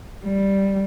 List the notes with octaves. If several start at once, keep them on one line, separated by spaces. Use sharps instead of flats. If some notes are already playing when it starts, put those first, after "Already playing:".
G3